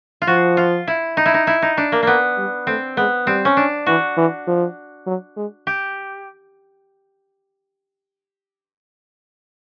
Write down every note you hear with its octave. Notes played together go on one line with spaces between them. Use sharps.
F4
F3 F#4
F4
E4
D#4
E4
D#4
E4
D#4
D4
A#3
A#3 B3
G3
A3 C4
G#3 B3
G3 C4
C#4
D4
E3 F#4
E3
F3
F#3
G#3
G4